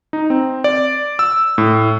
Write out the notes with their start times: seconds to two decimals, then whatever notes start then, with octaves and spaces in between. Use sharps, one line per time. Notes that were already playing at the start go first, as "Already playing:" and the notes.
0.13 D#4
0.30 C4
0.64 D5
1.19 E6
1.58 A2